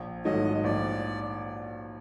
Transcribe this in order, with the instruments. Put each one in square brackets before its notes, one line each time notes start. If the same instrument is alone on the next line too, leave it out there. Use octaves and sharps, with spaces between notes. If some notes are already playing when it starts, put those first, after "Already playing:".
Already playing: [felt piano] A#1
[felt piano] G#2 D#3 F#3 A3 [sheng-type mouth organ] D#5
[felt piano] A#1 [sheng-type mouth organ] D5